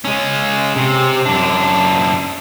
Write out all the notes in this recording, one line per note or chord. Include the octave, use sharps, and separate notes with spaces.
G#3 C#4
C3
F#2 D4